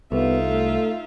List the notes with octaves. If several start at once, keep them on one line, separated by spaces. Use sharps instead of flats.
C2 B3 D#4 F4 A4 E5
A3